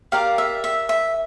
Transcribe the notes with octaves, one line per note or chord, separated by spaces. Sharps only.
G4 A#4 D5 F5
E5
E5
E5